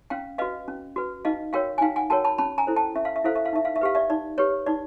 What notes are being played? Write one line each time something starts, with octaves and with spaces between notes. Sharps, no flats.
C#4 F5 G5
F#4 B4 D#5 F5
C#4
F#4 B4
D#4 D#5 F5
F#4 A#4 C#5 F5 G5
G#5
D#4 F5 G5
F#5 G#5
F#4 A#4 C#5 G5 A5
A5 B5
C#4 A5 B5
G#5 A#5
E4 A4 C5
G5 A5
C#4 E5
F5
E5
E4 A4 C5 F5
E5
F5
D#4 E5
F5
E5
G4 B4 F5
D5 E5
D#4 D5
G4 B4 C#5
D#4 D5